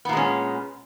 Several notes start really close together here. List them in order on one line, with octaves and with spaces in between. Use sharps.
B3 A#2 G#3 C#4